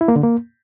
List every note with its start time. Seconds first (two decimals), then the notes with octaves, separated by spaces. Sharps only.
0.01 E4
0.08 A#3
0.16 D3
0.23 A#3